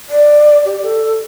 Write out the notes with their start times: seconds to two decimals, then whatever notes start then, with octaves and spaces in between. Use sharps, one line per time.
0.09 D5
0.65 G4
0.82 A4